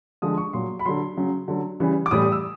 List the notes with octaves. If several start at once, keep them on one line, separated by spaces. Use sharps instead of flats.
D3 F3 G#3 D#6
C#6
A#2 F#3 C6
B5
D3 F#3 C6
C#3 F#3
D3 F#3
C#3 E3 G3
D6
A2 E3 G3 D#6
D#6
E6